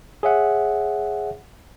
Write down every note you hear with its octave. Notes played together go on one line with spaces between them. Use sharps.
G#4 C#5 E5 F#5